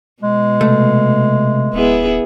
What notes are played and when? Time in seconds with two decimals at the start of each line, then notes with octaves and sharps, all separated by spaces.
0.23 B2 G#3
0.61 C3 A3
1.73 D1 B3 E4 G#4